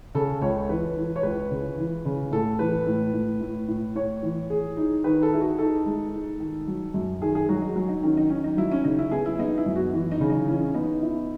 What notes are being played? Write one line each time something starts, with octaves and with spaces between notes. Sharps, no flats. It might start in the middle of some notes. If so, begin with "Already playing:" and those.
C#3 A4
C#2 C#5
E3 B4
E3
C#5
C#2 B4
C#3
E3
C#3
A2 A4
E3 B4
A2
A2
A2
A2
A2 C#5
E3
G#4
D#4
D#3 B4
A4
E4 G#4
F#4
D#4 A4
G#3
D#4
D#3
F#3
F#2
D#3 G#4
G#4
F#3 F#4
D#4
F#3
D#4
D#3 C#4
D#4
D#3 C#4
D#4
F#3 E4
C#4
C#3 D#4
E4
B3 G#4
E4
B3 D#4
E4
F#2
F#4
E3
D#4
C#3
D#4
E3 C#4
B3 D#4
E4